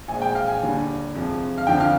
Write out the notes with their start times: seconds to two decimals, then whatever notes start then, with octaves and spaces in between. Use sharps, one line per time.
0.08 A#1 A#2 G#3 G#5
0.22 G5
0.35 F5
0.48 G#5
0.61 D#2 D3 G3
1.15 F2 C3 F3 G#3
1.58 F5
1.67 F2 D3 F3 G5
1.80 F5